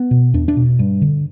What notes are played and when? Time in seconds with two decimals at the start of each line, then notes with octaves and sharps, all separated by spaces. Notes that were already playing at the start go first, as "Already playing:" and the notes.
Already playing: B3
0.11 B2
0.34 E2 D4
0.48 D4
0.57 B2
0.79 G2
1.02 D3